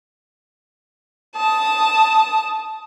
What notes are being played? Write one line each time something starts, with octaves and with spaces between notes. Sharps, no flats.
A5 D#6